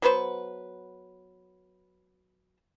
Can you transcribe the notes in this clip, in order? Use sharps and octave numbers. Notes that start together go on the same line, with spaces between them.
F#3 B3 B4 C5